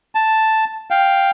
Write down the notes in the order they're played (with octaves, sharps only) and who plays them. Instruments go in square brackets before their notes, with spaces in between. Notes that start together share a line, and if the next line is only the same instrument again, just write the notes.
[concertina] A5
F5 G5